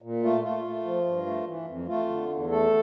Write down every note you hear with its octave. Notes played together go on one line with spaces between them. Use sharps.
A#2
A3 F4
A3 F4
A3
F3
G2
A3
E3
F2
A3 F4
D3
E2
A3 A4